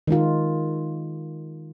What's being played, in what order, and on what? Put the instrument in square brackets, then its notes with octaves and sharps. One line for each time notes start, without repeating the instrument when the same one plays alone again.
[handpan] D#3 G#3 D#4 F4